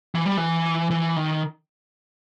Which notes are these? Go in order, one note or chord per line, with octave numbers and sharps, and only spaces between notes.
E3
G3
E3
E3
D#3